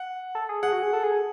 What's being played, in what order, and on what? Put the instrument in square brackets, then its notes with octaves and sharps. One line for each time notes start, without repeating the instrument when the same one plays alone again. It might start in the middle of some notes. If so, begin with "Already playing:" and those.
Already playing: [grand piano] F#5
[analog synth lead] A4
G#4
[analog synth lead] G#4 [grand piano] F#5
[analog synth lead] F#4
G#4
A4
G#4